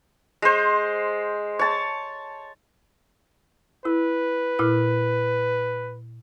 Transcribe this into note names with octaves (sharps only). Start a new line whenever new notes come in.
G#3 C5
C#5 A5
E4 B4
A#2 E4 F6